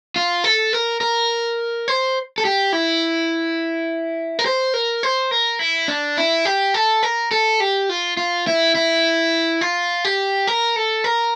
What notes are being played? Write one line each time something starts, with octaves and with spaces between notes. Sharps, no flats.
F4
A4
A#4
A#4
C5
A4
G4
E4
A#4
C5
A#4
C5
A#4
E4
D4
E4
G4
A4
A#4
A4
G4
F4
F4
E4
E4
F4
G4
A#4
A4
A#4